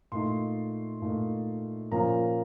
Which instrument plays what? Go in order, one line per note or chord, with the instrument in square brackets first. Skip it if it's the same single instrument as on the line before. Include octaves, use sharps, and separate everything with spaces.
[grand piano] A#2 A3 D#4 C6
A#2 A3 D#4
A#2 F3 A#3 C#4 F4 A#5